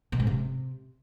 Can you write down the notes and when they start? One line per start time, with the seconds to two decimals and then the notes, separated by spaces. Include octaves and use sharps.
0.12 B2
0.20 G#2
0.27 C3